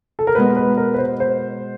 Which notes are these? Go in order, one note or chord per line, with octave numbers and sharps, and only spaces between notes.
A4
A#4
B2 G#3 B3 B4
B4
A#4
B4
C5
C5